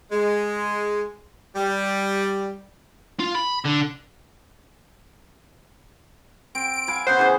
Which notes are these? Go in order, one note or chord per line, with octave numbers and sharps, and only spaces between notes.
G#3
G3
F4
B5
D3
C4 D7
D7
F5 G#5 B5
C#3 B3 C5 F#5
E3 B4